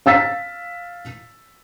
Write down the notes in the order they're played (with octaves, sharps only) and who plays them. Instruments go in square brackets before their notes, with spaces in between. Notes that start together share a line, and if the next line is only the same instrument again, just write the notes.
[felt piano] F5 E6 A6 B6